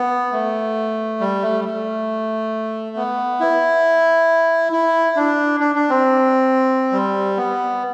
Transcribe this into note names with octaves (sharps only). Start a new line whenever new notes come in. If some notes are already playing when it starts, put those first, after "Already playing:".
Already playing: B3
A3
G3
A3
G3
A3
B3
E4
E4
D4
D4
D4
C4
G3
B3